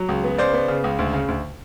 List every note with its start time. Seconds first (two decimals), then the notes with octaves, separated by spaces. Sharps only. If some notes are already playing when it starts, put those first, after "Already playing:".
Already playing: F#3
0.09 C#2
0.24 B3
0.38 C#3 C5 D5
0.54 B3
0.68 C#3
0.84 C#2
0.99 D2
1.13 C#3
1.28 D2